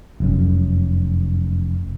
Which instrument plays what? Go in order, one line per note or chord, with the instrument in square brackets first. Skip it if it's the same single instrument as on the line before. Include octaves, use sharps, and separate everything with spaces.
[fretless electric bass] F1 F#2